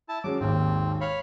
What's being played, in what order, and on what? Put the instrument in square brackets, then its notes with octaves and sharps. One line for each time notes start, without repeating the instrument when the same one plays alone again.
[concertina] E4 A5
[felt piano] F#3 G#3 C#4 [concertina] D6
[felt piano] G#1 D#2 G#2 [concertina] C4
[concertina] C#5 F5 B5